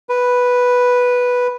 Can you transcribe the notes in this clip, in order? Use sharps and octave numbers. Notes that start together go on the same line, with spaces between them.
B4